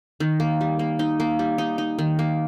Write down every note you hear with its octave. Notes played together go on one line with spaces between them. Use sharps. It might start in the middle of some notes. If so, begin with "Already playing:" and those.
D#3
A#3
G3
A#3
D#4
A#3
G3
D#4
D#4
D#3
A#3